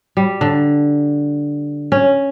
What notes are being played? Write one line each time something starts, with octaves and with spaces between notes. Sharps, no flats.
G3
D3
C#4